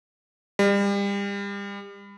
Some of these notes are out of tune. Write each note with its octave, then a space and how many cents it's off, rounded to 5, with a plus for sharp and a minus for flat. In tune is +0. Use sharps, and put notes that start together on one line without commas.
G3 +35